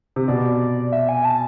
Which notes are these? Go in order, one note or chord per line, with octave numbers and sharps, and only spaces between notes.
C3
B2 D5
E5
G#5
A5